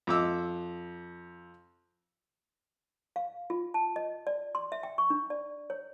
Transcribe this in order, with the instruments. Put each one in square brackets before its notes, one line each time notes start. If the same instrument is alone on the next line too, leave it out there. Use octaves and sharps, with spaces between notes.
[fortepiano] F2 D6 E6
[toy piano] F5
F4
A5
D#5
D5
C6
E5
G5
C#6
D4
D5
C#5